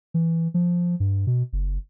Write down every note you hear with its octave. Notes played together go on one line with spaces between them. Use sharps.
E3
F3
G2
B2
F#1